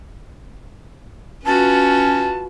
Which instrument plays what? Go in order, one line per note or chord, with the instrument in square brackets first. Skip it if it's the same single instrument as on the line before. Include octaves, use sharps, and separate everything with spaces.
[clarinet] C#4 [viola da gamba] F4 F#4 B4 [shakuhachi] A5